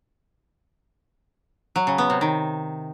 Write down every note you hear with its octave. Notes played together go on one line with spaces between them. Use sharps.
F#3
C#3
B3
C3
D#3